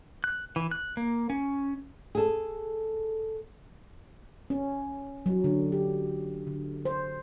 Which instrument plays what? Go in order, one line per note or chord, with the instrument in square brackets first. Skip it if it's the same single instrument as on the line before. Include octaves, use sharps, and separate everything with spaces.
[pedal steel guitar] F#6
E3
F#6
A#3
C#4
[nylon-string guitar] G#4 A4
[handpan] C#4
F#3
D3
G4
D3
C5